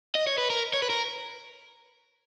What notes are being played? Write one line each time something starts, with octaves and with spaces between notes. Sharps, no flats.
D#5
C#5
B4
A#4
C#5
B4
A#4